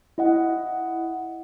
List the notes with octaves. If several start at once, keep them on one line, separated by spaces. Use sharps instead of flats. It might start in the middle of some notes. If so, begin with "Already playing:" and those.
E4 D#5 F#5